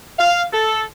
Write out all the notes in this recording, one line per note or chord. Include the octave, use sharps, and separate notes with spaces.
F5
A4